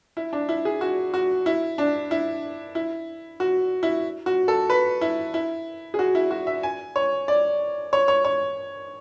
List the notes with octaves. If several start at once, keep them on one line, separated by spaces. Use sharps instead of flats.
E4
D4
E4
G#4
F#4
F#4
E4
D4
E4
E4
F#4
E4
F#4
A4
B4
E4
E4
G#4
F#4
E4
F#4
E5
G#5
C#5
D5
C#5
C#5
C#5